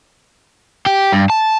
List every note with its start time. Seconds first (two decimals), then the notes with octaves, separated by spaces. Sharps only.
0.86 G4
1.12 G2
1.30 A5